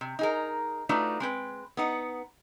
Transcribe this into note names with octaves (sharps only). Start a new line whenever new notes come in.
C3
D#4 G#4 A#4
A3 D4 D#4 F4 F#4 B4
G#3 C4 B4
B3 D#4 F#5